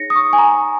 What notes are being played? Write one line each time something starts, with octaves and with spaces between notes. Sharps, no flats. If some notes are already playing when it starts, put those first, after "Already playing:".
Already playing: D#4 G#4 C#5 A#6 C#7
D#6
C#6
G#5
A#5